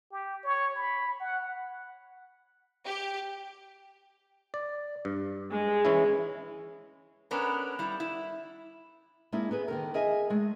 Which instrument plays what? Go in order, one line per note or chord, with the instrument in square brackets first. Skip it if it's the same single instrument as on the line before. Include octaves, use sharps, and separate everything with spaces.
[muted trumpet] G4
C#5
B5
F#5
[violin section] G4
[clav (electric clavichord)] D5
G2
[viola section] G#3
[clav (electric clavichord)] E3 C#4 E4
[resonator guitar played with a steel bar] B3 C#4 D4 A4 A#4
G3 E4
E4
[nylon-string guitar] G#3 A#3 C4 D4 E4
B3 G#4 B4
D3 D#3 A#4
G#4 A#4 D#5 E5 G#5
G#3 A3